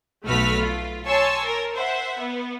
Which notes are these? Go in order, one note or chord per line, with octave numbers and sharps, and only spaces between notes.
B1 A3 F#4 B4 F6 B6
F4
C#5 G#5 A5 C6 C#6 E6
A#4
C5 E5 F#5
B3